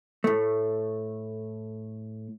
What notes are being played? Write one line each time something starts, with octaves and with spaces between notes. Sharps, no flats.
A2 A3